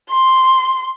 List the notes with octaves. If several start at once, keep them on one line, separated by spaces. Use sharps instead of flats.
C6